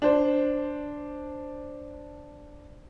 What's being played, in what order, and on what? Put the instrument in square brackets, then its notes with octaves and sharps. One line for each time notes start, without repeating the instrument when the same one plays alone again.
[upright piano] D4 C5